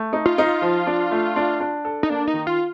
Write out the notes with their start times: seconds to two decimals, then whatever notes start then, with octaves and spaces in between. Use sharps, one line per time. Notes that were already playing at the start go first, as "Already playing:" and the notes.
Already playing: A3
0.13 D#4
0.26 F4
0.38 D#4
0.62 F3
0.87 D4
1.11 A3
1.36 D4
1.60 D4
1.85 A4
2.03 D#4
2.10 A#3 D4
2.27 D#4
2.34 D#3
2.47 F4